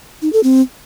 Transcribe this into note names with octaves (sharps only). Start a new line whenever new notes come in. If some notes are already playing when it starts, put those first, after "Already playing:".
D#4
A4
C4